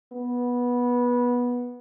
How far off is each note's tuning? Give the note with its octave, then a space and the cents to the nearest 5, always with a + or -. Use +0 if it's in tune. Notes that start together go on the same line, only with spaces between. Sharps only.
B3 -15